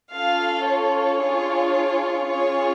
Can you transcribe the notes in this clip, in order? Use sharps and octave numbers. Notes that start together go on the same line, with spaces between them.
C#4 F4 A4 F5
C#5
D4 F4 G#4
C#4 F4 G#4 C#5